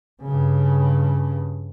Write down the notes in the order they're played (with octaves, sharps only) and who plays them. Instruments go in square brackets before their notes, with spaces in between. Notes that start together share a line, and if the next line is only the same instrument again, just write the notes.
[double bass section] G2 C#3